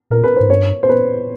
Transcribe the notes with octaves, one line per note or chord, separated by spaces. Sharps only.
A#2 A#4
B4
G#2 C5
G2 C#5
C5
B4